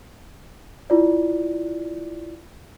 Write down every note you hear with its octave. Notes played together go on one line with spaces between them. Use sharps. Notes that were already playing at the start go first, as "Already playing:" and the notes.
E4 F4 D5